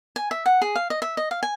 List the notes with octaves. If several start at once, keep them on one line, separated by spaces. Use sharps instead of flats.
G#5
E5
F#5
G#4
F5
D#5
E5
D#5
F5
G#5